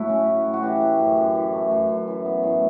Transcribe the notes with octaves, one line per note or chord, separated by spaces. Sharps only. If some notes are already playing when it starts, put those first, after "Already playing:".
Already playing: A2 F#3 E4 F#4 A4
C#4
A2
A2
F#4
E3 G4
A3
F#2
F#2
E3
A3
F#2
F#2
E3
B3
A2